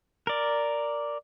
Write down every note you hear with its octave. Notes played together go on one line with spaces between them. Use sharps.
A#4 D5